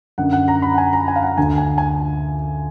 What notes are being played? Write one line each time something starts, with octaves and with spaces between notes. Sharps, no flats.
F#2 D3 F#5
F#5
A#5
B5
F#5
G#5
A#5
G#5
F5
F#5
D2 D3 G#5
G#5
G#5